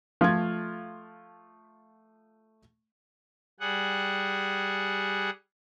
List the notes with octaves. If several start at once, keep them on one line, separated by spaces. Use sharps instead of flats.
F3 A3 F4 G#6
G3 G#4 F#5